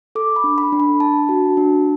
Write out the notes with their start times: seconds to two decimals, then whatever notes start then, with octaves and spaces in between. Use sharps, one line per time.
0.15 A4 D6
0.36 B5
0.44 D4
0.58 B5
0.72 D4
0.80 B5
1.00 D4 A5
1.29 F#4
1.57 D4